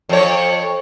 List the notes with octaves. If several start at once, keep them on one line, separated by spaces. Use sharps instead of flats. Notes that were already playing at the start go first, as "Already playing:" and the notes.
F2 C#5